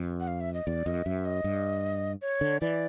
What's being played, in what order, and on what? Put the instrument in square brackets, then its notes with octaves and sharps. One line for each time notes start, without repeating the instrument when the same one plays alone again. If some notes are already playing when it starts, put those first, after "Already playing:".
Already playing: [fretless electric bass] F2
[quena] F#5
F5
E5
D#5
[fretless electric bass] E2 [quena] D5
[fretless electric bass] F2 [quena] D#5
[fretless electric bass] F#2 [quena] E5
[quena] D#5
[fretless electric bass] G2
[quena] C#5
[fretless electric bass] D3
[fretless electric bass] E3 [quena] D5